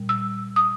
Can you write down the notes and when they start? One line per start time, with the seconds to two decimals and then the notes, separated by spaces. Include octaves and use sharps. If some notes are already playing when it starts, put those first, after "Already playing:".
Already playing: A#2 G3
0.09 E6
0.56 D#6